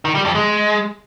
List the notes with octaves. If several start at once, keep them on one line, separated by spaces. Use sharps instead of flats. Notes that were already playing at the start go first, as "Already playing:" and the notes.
D#3
G3
F2
G#3